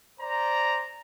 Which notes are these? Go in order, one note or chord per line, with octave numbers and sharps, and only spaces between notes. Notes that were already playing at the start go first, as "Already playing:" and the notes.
C5 D5 A#5